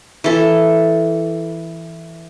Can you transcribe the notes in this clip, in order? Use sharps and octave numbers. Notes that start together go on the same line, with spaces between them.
E3 A4